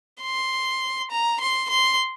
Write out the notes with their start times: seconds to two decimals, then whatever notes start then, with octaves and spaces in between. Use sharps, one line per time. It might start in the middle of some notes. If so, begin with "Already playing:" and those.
0.21 C6
1.11 A#5
1.40 C6
1.70 C6